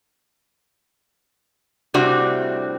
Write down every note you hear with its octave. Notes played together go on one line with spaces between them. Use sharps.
A2 C3 G3 C4 D4 F#4